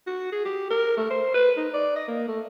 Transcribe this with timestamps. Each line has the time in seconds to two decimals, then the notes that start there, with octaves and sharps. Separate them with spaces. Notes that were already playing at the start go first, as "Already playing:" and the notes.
0.06 F#4
0.32 G#4
0.45 G4
0.70 A#4
0.97 A3
1.10 C5
1.34 B4
1.57 D#4
1.74 D5
1.96 D#5
2.08 A#3
2.28 A3